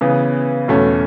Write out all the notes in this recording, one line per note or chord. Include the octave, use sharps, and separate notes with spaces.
C#3 E3 B3
E2 B2 A3 C#4